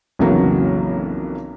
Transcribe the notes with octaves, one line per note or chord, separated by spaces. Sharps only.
B1 F2 C#3 E3 F#3 A#3